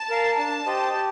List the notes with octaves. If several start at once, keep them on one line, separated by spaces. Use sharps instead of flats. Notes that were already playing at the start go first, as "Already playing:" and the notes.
Already playing: A5
A#4 F5
D4 A5
G4 C5 D#5
G4